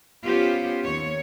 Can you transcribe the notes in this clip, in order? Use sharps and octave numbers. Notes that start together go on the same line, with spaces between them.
B3 C#4 F4 G4 C5
D#2 C#5